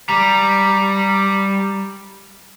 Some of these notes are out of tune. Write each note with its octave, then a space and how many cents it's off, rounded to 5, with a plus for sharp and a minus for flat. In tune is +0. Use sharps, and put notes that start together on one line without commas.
G3 +0 A#5 +0